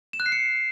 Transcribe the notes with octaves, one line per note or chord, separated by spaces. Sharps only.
E7
F#6
C7
C#7